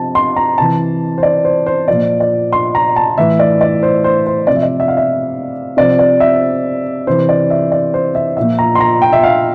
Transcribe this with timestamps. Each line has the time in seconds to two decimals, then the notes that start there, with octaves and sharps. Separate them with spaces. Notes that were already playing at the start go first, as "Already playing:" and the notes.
Already playing: C3 F3 A5
0.15 C6
0.36 A#5
0.58 C3 E3 A5
1.18 C5
1.23 D5
1.45 C5
1.66 C5
1.88 A#2 F3 D5
2.20 D5
2.53 C6
2.75 A#5
2.96 A5
3.18 A2 E3 E5
3.39 D5
3.61 D5
3.83 C5
4.04 C5
4.26 C5
4.47 C3 F3 D5
4.56 E5
4.63 D5
4.80 E5
4.88 F5
4.97 E5
5.77 C3 F3 D5
5.99 D5
6.20 E5
7.07 C3 E3 C5
7.29 D5
7.50 E5
7.72 D5
7.94 C5
8.15 E5
8.37 A#2 F3 E5
8.59 A#5
8.75 C6
8.80 A#5
9.02 G5
9.13 E5
9.23 F5